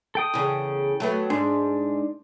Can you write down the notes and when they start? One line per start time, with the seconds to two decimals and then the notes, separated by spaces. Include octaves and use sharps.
0.15 A4 G5 D#6
0.34 E2 C#3
1.00 F#3 A3 B3
1.30 G#2 D4